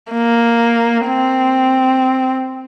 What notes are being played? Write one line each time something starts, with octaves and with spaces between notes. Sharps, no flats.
A#3
C4